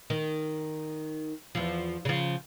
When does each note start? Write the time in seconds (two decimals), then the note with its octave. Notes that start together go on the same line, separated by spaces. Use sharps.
0.10 D#3
1.55 E2 F3
2.05 C#3 F3